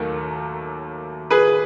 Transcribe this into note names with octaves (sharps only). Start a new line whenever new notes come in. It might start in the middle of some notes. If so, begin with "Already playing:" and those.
Already playing: D#2 D#3 F#3 A3
G#4 B4